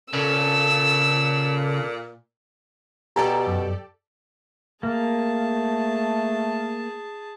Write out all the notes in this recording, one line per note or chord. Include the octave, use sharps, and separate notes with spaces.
A#2 C#3 A4 E6
B2 G4 A4 D5 G#5 A#5
F#2
A3 A#3 G#4 A5